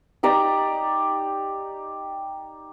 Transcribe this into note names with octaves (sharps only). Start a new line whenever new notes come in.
D#4 G4 D5 A#5